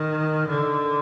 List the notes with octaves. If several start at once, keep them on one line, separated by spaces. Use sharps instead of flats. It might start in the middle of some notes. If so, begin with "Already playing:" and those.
Already playing: D#3
D3